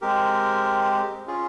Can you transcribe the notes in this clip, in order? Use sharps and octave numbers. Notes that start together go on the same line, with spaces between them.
G#3 C4 G4 A#4
C#4 F4 G#4